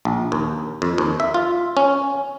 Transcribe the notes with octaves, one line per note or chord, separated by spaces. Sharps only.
A#1
D#2
F2
D#2
E5
F4
C#4